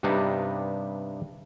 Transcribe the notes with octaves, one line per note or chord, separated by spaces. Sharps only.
G2 C3 G3 B3 D4 D#4